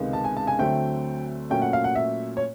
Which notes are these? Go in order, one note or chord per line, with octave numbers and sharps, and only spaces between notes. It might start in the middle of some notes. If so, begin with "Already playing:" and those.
Already playing: C#2 C3 D#3 G#3 B3
A5
G#5
A5
G#5
D2 D3 F#3 A3 C4 G5
A#2 F#3 A3 C#4 G5
F#5
F5
F#5
E5
C#5